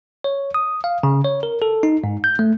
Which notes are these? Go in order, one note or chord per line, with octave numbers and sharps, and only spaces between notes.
C#5
D#6
F5
C#3
C#5
A#4
A4
D#4
G#2
G6
A3